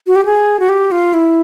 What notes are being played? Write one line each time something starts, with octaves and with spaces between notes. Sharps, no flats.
F#4
G4
G#4
F#4
G4
F4
E4